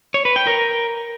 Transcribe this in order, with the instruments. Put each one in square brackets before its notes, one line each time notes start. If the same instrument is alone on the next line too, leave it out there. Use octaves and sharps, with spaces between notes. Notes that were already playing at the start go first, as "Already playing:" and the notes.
[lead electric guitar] C#5
B4
G5
A#4